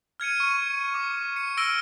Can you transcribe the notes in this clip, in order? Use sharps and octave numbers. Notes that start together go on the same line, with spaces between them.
F6 G#6 C#7 D#7
C#6
D6
C#7
E6 F6 A#6 D7 G7